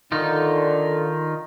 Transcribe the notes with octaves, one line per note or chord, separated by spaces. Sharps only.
D3 D#3 D#4 F4